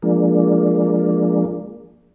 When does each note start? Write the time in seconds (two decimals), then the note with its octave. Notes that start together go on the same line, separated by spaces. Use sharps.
0.02 F3 G#3 A#3 D4